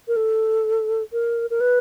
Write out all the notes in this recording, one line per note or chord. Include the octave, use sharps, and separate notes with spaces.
A#4
A4
A#4
A#4
B4